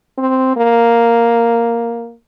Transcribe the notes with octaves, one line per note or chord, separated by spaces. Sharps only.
C4
A#3